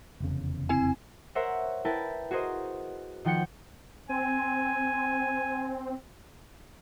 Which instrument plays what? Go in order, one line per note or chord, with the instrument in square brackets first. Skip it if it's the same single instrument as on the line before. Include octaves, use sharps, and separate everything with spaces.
[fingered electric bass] F1 E2 C#3
[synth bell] C4 E4 G#5
[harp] A#4 C5 C#5 E5 F#5
E4 A#4 B4 G5 A5
F#4 G#4 A#4 C5 D#5
D#3 F3 F#5 G5 G6 C#7
[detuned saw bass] C4 [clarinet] G#5